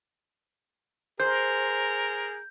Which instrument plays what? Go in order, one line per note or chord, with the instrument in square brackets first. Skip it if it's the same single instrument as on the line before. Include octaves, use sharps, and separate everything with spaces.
[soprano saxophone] G#4 [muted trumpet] A#4 [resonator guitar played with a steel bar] C5 [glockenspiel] G6